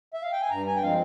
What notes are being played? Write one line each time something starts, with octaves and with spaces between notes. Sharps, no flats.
E5
F5
G5
G#5
G2 A#5
G#5
G5
F3 G#3 C4 F5